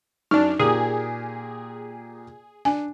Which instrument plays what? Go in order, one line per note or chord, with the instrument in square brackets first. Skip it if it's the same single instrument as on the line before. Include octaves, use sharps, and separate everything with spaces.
[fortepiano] F#2 [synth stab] D4 F6 [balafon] D#4
[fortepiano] A#2 A#3 G4 [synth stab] G#4
[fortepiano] D4 [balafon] G#5